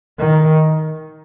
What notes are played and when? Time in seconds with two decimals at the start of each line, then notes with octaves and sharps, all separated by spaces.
0.19 D#3